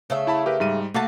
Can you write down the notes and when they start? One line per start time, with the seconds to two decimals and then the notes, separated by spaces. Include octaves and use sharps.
0.10 C#3 A3 E5
0.27 E4 A5 B5
0.46 G4 A#4 B4
0.60 G#2 G3 D#7
0.94 A3 A#3 F#4 A5